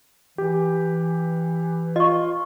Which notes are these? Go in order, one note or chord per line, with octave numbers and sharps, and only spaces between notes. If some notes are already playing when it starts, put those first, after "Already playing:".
E3 G4
F4 D#5 C#6